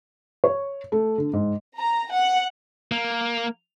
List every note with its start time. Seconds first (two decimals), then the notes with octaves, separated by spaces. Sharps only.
0.44 C#5
0.92 A3
1.18 D3
1.33 G#2
1.78 A#5
2.12 F#5
2.92 A#3